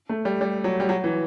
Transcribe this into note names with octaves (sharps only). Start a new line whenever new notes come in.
A3
G3
G3
F#3
G3
F#3
E3